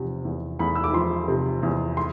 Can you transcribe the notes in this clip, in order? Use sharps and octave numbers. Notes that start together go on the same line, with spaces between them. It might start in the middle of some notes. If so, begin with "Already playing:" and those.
Already playing: E2 C3 F3
E2
E2 B5
E6
D6
F3 C6
C3
E2
C6